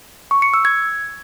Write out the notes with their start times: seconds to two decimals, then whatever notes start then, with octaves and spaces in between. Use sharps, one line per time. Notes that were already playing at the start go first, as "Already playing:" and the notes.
0.31 C#6
0.42 C#7
0.54 E6
0.65 G#6